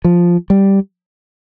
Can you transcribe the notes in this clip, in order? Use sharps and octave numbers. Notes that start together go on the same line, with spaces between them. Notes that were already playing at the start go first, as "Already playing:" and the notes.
F3
G3